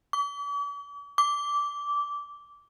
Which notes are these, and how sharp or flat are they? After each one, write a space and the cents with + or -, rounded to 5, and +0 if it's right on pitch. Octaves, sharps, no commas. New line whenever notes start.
D6 -45
D6 -15